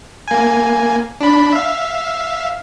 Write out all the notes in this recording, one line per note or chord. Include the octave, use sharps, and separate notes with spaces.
A#3 G#5
D4 B5
E5 F5